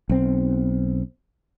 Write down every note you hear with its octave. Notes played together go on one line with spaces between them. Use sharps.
B1 C4